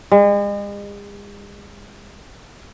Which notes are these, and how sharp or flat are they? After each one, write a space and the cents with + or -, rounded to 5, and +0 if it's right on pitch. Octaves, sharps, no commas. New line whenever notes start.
G#3 -40